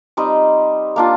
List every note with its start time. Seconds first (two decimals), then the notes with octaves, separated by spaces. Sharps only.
0.17 G3 C4 D#4
0.96 A#3 D4 F4